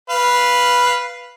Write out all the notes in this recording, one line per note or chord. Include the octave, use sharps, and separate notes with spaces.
B4 F5